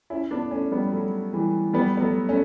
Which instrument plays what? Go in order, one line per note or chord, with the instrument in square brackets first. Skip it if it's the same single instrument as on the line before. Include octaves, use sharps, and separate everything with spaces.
[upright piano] C#4 E4
B3 D4
A3 C#4
G3 B3
F#3 A3
E3 G3
G3 B3
B3
F#3 A3
A3 C#4